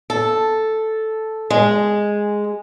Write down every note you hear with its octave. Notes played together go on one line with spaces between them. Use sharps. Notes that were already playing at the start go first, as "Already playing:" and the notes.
A4
G#3